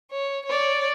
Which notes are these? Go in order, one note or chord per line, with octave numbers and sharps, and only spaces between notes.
C#5
C#5 D5